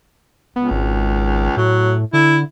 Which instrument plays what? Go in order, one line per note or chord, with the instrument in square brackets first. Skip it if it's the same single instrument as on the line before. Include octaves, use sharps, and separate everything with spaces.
[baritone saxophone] C#2 [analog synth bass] B3
[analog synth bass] G#1
[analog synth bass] A2 [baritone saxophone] F#3
[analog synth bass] D3 [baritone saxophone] E4